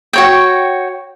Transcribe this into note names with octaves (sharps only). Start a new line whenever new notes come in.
F#4 C#5 G5